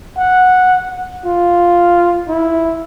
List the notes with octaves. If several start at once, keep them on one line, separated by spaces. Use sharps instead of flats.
F#5
F4
E4